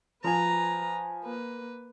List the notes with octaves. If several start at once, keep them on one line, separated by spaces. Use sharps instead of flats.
F3 B4 G#5 A#5
A#3 B4